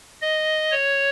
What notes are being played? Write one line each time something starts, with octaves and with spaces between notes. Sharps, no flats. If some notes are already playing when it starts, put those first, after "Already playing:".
D#5
C#5